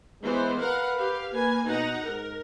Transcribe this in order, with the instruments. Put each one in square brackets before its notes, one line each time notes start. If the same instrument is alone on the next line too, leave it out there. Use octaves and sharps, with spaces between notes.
[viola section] E3 B3 C5 [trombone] G#3
[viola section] A#4 F5 F#5 [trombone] B4
[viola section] G4 F5
[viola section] A#3 G#5 [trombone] B4
[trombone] B2 [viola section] D#4 F#5 A#5
[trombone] G#2 [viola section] A#4